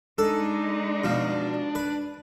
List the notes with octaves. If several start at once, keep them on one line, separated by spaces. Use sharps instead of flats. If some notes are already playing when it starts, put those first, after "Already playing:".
G#3 D4 D#4 A4
B2 F3
B4